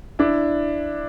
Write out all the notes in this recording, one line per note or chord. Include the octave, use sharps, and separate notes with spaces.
D4 E4